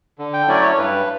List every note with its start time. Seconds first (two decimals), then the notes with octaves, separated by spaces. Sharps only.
0.19 D3
0.34 G5
0.48 F#3 A3 C#4 E4 D5
0.63 C#5
0.78 G2 B4